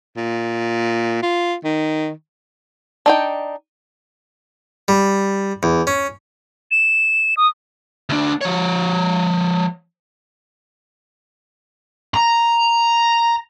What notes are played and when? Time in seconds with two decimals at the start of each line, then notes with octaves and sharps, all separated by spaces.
0.17 A#2
1.23 F4
1.64 D#3
3.06 D4 D#4 G5
4.88 G3
5.63 E2
5.87 C#4
6.71 E7
7.37 D#6
8.09 D2 D4
8.41 F3 C#5
12.14 A#5